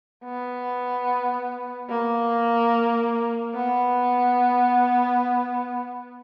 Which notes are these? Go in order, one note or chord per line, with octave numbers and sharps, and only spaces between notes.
B3
A#3
B3